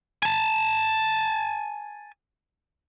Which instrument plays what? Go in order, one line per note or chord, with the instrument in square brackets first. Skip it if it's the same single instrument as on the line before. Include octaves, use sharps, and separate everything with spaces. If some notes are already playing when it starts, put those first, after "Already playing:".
[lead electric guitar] G#5 A5